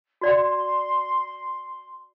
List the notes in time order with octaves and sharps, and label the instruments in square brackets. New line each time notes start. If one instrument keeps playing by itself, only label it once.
[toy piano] F#4 D5 F#5 [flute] C6